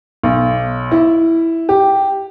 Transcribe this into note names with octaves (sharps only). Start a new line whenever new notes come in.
B1
E4
G4